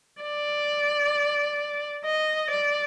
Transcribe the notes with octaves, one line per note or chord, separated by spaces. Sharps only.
D5
D#5
D5